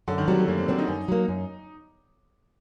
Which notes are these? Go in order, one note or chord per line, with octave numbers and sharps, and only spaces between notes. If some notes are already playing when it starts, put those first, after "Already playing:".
F#2 D3
D#3
F#3 G3 C4
A3
F#2 A#3
C4
F#3 C4 D4
D#4
F#2
F#3 A#3
F#2